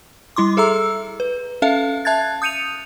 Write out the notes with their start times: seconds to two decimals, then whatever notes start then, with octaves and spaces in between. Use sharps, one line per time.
0.36 G3 E4 C6 D6
0.57 G#4 A4 E5 A#5 E6
1.20 B4
1.62 C#4 A4 E5 F5
2.05 E5 A5 F#6 G#6 A6
2.42 D#6 G6 C#7 D#7 F7